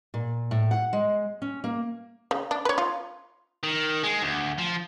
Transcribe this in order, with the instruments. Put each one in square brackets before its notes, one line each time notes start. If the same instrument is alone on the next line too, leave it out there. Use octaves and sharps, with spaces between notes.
[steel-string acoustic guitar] A#2
A2
F#5
G#3
C#4
A#3
[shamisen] C#3
D4
B4 C#5
F4
[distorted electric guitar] D#3
G#3
D2
F3